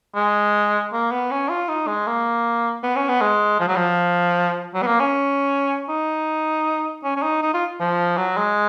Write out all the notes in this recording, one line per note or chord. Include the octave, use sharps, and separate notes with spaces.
G#3
A#3
B3
C#4
F4
D#4
G#3
A#3
B3
C#4
B3
G#3
F3
F#3
F3
F#3
B3
A#3
C#4
D#4
C#4
C#4
D#4
D#4
F4
F3
F#3
G#3